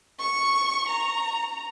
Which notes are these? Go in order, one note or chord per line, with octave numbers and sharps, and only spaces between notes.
C#6
A#5